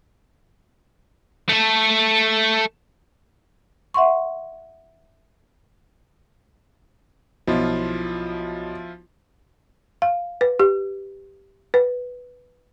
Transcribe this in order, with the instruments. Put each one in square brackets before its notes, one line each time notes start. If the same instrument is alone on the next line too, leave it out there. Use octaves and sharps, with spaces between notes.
[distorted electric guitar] A3 A4
[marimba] E5 F#5 C6 C#6
[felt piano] B1 [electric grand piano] F3 E4 F4
[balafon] F5
B4
G4
B4